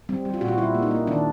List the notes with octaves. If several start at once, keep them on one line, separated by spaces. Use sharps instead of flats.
G3 C4
G3
F4
A#2 F#4
F4
G3 E4
A#3
D#4
A#3
D#3 D4